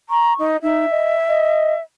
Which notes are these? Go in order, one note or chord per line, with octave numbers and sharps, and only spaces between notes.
A#5 C#6
D#4
D#4 E5
D#5
D#5